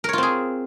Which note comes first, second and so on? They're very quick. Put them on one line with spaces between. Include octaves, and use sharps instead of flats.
A#4 C#5 F4 C4 G#4